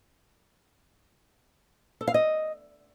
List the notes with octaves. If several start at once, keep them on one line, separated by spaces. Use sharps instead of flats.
A4
F5
D#5